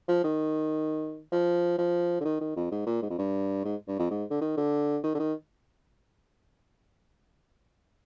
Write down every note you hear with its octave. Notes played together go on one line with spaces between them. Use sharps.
F3
D#3
F3
F3
D3
D#3
D#3
F2
G#2
A#2
G#2
F2
G2
G#2
G2
F2
G#2
D3
D#3
D3
D#3
D3
D#3